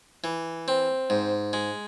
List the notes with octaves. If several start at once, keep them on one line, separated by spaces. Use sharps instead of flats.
E3
C4
G#2
G#3